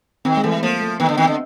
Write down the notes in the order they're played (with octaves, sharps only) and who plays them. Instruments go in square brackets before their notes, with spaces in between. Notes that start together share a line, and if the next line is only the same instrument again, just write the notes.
[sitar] D#3 [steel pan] C4
[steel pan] G#3
[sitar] E3 [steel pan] A3
[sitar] F3 [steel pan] A#3
[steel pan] A3
[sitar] D#3 [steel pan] B3
[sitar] D3
[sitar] D#3 [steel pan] C4
[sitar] D3